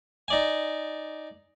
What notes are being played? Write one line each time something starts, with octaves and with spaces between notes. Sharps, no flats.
D#4 D5 G#5